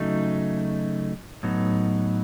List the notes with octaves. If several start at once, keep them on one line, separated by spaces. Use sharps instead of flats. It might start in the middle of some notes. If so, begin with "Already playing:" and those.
Already playing: C#3 F#3 A3 D#4
A2 F#3 B3 D#4